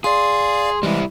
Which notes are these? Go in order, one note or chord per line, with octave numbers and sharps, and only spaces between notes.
G#4 D5 F5 C6
E3 G3 G#3 E4